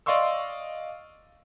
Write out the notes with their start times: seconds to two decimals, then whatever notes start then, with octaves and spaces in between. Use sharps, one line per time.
0.06 D5 D#5 F5 C6 C#6 E6